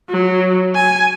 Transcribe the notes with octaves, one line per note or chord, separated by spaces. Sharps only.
F#3
G#5